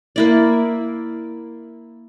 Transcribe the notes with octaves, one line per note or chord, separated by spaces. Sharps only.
A#3 E4 D5